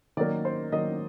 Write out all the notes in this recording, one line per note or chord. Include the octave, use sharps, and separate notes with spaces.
D#3 F#3 A#3 D5
C5
D#3 F#3 A#3 D#5